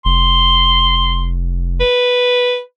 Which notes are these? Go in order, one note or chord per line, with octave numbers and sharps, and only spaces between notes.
F1 C6
B4